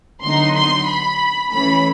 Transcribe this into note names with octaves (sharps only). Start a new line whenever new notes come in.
D3 F#3 B3 D#4 C6
C6
B5
E3 A3 C#4 B5